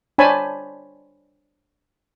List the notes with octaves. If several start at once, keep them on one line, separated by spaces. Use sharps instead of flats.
D4 C5 C#5 G#5 A5 B5